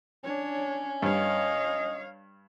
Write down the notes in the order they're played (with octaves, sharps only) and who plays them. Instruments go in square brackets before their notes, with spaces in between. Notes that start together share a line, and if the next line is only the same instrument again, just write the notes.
[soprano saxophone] C#4 [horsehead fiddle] D4 C#5
[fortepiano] G2 [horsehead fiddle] C#5 F5 [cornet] D#5